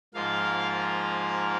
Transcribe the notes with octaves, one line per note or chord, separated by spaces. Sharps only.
G#2 F3 A#3 F4 F5